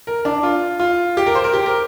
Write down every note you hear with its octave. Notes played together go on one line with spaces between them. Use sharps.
A#4
D4
F4
F4
G4
A#4
C5
A#4
G4
A#4